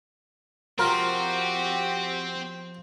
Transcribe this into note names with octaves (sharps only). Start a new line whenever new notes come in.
F3 C4 F#4 G4 A#4